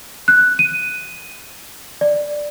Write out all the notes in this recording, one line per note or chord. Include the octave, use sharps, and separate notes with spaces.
F#6
D#7
D5